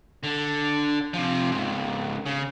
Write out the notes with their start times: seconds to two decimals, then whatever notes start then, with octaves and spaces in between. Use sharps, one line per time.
0.24 D3
1.14 C3 F3
1.52 C#2 G#2
2.26 C#3